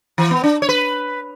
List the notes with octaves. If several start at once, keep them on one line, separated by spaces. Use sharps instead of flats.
E3
B3
D4
C#5
B4